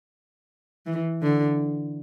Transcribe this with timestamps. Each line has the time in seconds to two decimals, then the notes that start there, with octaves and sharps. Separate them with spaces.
0.86 E3
1.22 D3